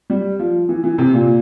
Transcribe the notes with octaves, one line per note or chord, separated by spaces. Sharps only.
G3
F3
E3
E3
C3
A#2